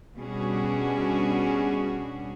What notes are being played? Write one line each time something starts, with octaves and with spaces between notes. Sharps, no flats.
B2 G3 C#4 D4 F#4 G#4